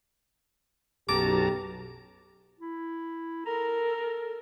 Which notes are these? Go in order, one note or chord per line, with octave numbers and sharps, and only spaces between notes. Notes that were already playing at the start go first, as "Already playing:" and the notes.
B1 F#2 G4 A5 A#5 D6
E4
A4 A#4 A#5